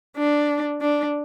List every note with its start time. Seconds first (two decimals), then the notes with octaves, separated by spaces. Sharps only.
0.17 D4
0.81 D4